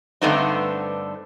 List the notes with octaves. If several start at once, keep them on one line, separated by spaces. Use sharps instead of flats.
G2 D3 A3 B3 C4 D#4